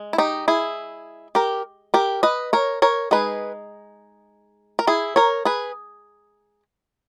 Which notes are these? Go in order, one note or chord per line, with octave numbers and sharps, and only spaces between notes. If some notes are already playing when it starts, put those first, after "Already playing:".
Already playing: G#3
E4
D#4 G4
E4 G#4
G4 A#4
G4 A#4
B4 D#5
A#4 C#5
A#4 C#5
G#3 D#4 G#4 B4
A#4
E4 G#4
A#4 C#5
G#4 B4